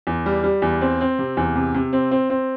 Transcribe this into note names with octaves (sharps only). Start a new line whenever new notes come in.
E2
G3
G3
E2
C4
C4
C3
E2
C3
C3
C4
C4
C4